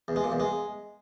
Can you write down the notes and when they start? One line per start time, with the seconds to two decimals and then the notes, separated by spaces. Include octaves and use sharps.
0.08 E2
0.16 G#3
0.24 A#2
0.32 E2
0.40 G#3